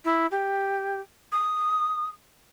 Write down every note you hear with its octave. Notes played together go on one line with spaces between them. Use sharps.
E4
G4
D#6